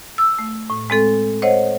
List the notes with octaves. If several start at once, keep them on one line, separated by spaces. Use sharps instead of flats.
E6
A3
A2
G#3 C4 A4
C5 C#5 D#5 F#5